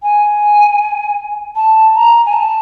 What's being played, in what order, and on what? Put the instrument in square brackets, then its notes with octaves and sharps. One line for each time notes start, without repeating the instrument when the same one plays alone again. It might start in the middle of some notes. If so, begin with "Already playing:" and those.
[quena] G#5
A5
A#5
G#5
A5